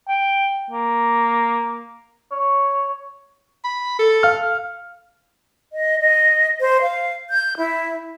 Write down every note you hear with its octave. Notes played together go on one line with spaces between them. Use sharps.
G5
A#3
C#5
B5
A4
F5 F6
D#5
D#5
C5
F5
G6
E4